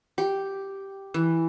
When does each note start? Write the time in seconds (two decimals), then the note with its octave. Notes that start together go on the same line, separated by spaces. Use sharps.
0.18 G4
1.14 E3